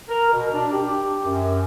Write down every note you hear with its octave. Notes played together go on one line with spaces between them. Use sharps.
A#4
B2
D4
G4
F#2